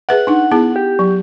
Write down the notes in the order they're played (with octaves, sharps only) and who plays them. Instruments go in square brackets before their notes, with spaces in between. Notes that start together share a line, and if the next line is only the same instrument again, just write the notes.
[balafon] G#4 B4 E5 [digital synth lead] F#5
[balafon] D4 D#4
B3 E4 G#4
[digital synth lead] G4
[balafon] F#3